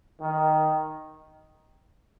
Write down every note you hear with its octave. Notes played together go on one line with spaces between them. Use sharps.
D#3